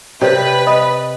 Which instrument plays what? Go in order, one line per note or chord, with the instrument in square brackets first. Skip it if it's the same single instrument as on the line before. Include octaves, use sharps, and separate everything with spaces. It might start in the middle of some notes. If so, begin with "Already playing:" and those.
[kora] C3 [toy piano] A#4 C#5 D5 [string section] B4
[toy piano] D#5 B5 D#6